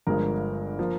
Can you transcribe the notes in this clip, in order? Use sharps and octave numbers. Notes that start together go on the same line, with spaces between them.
G1 G2 F3 G#3 A#4
F3 A#3